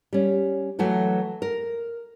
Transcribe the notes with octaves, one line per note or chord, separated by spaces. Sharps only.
G3 C#4
E3 F#3 A3 F#4 B4
A#4